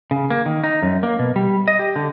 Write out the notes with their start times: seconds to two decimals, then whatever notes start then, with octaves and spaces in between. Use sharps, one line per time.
0.11 C#3
0.30 A#3
0.46 D#3
0.63 D#4
0.82 F#2
1.03 A#3
1.19 B2
1.36 G3
1.68 D#5
1.79 G4
1.96 D3